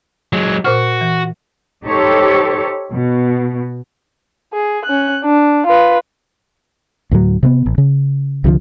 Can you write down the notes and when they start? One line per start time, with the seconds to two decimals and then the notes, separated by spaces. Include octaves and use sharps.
0.33 F#3 G#3
0.65 A#2 F#4 C5 F6
1.01 E3
1.85 D#4 G4 A4 C5 C#5
2.92 B2
4.53 G#4
4.85 C#4 F#6
5.25 D4
5.66 F4 B4
7.11 D2 A2 F#3
7.43 C3 A#3 B3
7.66 A1
7.78 C#3
8.44 C2 D3 E3 F3